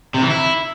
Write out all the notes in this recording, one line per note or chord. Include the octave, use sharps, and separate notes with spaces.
C3
E3
E4